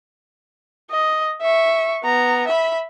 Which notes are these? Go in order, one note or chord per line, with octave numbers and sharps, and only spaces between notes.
D#5
E5 C#6
B3 A#5
E5 B5